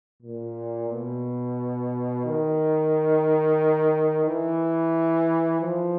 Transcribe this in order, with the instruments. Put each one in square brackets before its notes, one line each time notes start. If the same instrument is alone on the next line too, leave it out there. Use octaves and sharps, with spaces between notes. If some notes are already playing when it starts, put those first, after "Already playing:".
[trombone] A#2
B2
D#3
E3
F3